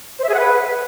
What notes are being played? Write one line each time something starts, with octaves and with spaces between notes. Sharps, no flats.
C5
E5
G#4
F#5
B4